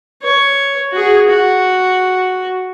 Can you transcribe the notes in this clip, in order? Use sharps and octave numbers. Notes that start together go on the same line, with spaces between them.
C#5
F#4 G#4
F#4